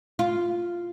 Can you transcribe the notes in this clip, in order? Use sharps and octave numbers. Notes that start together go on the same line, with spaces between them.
F4